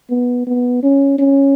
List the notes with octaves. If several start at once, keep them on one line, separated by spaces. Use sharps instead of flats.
B3
B3
C#4
C#4